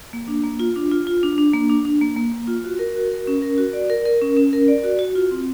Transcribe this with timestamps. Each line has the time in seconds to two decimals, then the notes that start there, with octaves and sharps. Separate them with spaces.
0.13 A#3
0.28 D4
0.43 A#3
0.59 F4
0.76 D4
0.91 F4
1.07 F4
1.23 D4
1.38 D4
1.54 A#3
1.70 D4
1.85 D4
2.01 A#3
2.16 A#3
2.32 A#3
2.48 F4
2.64 F#4
2.79 A#4
2.96 F#4
3.11 A#4
3.27 C#4
3.42 A#4
3.58 F#4
3.73 D5
3.90 A#4
4.05 A#4
4.22 C#4
4.36 C#4
4.53 A#4
4.68 D5
4.84 F#4
4.99 F#4
5.15 F4
5.31 C4